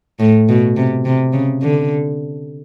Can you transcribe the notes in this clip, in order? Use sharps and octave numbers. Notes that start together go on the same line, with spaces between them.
A2
B2
C3
C3
C#3
D3